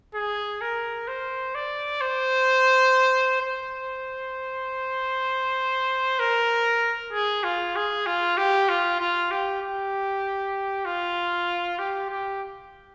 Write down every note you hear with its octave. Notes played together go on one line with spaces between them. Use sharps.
G#4
A#4
C5
D5
C5
C5
A#4
G#4
F4
G#4
F4
G4
F4
F4
G4
G4
F4
G4
G4